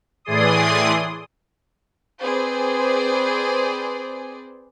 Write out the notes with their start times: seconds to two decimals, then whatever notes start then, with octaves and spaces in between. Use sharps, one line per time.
0.25 A2 E3 G#4 D5 C6 D#6
2.22 C4 G#4 B4 C5 D5